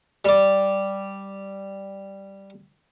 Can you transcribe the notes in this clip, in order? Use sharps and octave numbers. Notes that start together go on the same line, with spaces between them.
G3 D5